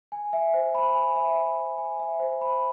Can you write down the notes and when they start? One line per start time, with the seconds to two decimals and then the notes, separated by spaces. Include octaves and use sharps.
0.12 G#5
0.33 E5
0.54 C5
0.75 B5
0.95 G#5
1.16 E5
1.37 C5
1.58 B5
1.78 G#5
2.00 E5
2.20 C5
2.41 B5